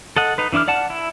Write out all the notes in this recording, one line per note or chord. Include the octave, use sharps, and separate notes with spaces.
A4 D#5 F#5
D#4 B4
E3 D4 E4 D6 F6
D5 F#5 A5
E4